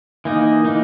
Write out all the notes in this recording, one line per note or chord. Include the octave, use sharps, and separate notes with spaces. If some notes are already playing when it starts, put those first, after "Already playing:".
E3 A#3 D#4
E3 A#3 D#4